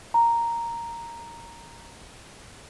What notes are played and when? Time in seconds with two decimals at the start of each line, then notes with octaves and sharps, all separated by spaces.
0.14 A#5